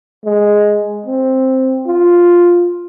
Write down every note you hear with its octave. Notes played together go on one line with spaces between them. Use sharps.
G#3
C4
F4